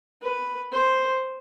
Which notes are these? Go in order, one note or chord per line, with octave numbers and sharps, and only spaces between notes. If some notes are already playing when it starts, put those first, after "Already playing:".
B4
C5